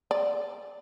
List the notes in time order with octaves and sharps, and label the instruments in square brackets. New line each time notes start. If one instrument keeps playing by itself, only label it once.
[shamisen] D5